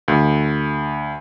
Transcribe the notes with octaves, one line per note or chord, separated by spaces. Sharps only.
D2